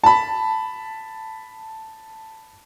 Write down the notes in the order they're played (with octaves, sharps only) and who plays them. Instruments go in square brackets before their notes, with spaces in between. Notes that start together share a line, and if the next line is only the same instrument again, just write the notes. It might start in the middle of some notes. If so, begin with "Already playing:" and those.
[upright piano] A5 B5